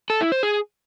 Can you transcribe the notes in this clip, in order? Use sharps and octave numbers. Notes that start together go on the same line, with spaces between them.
A4
E4
C5
G#4